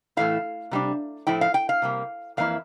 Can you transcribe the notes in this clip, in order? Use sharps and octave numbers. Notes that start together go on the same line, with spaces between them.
A2 E3 A3 E4 F5
C3 G3 D4
A2 F3 A3 E4 G5
F5
G5
F5
C3 G3 A#3
F2 E3 A#3 E4 F5